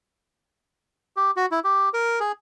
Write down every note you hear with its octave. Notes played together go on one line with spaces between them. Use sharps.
G4
F#4
E4
G4
A#4
G#4